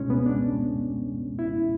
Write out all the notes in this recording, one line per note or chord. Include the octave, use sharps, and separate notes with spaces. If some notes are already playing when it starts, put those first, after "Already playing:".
Already playing: C#2 B2 G#3 C#4
B3
D4
E4